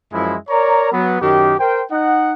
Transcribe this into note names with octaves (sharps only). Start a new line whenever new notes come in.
F#2 F3 G#3 E4
A#4 C#5 D5 A#5
F#3 B3
F#2 D#3 G4
A#4 C5 G5
D#4 D#5 F#5